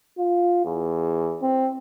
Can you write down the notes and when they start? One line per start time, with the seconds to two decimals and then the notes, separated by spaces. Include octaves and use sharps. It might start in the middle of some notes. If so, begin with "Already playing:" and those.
0.18 F4
0.65 E2
1.42 C4